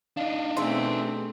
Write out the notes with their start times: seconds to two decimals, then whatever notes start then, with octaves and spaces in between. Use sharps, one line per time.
0.17 D4 D#4 F5
0.57 B2 E3 A3 C4 G#4 E5 C6